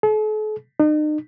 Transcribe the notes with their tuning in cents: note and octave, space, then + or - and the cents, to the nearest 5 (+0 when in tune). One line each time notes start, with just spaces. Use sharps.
A4 -45
D#4 -40